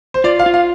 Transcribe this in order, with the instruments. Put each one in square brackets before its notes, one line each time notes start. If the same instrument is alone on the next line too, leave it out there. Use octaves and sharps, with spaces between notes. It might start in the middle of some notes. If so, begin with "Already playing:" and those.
[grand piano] C5
[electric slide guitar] F4 [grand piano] D5
[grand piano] F5
[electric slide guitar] F4
[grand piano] F5